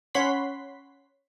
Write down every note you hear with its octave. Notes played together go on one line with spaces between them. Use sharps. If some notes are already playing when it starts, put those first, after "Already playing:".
C#4 C#5 F#5 B5 C6 B6